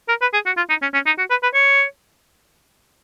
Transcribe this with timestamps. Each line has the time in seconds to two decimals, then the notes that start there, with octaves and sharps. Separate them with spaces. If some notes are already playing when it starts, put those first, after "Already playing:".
0.09 A#4
0.21 B4
0.34 G#4
0.46 F#4
0.57 F4
0.70 D#4
0.82 C#4
0.94 C#4
1.06 D#4
1.18 F#4
1.30 B4
1.43 B4
1.54 C#5